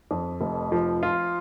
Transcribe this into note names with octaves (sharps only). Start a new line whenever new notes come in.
F2
F1
F3
F4